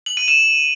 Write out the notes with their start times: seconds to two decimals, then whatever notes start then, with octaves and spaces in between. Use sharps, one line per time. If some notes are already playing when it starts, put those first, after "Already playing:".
0.06 F#7
0.17 D#7
0.28 E7